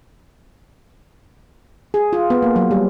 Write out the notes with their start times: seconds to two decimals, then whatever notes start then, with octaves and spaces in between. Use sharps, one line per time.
1.94 G#4
2.13 F4
2.30 B3
2.43 A#3
2.56 F#3
2.71 G3